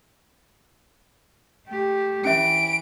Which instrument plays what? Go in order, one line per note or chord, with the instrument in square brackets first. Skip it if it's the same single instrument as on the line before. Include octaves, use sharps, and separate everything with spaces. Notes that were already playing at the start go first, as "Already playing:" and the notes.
[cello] A3 G4
[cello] E3 [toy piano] C#4 E5 [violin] D7